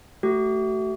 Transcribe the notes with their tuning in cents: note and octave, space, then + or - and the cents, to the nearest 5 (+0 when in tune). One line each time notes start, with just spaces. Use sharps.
A3 +0 F#4 +45